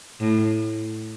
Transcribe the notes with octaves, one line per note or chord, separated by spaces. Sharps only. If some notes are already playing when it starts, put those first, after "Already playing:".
A2